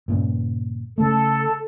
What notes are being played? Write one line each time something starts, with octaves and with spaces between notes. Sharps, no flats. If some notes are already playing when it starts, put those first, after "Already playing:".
G2 A#2 C#3
C#3 A3 A4